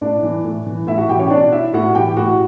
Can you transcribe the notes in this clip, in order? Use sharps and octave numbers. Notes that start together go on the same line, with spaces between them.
A2 D4 D5
E3
A2
E3
A2 E4 E5
F#4 F#5
E3 G4 G5
C#4 C#5
B2 D4 D5
E4 E5
A2 F#4 F#5
E3 G4 G5
A2 F#4 F#5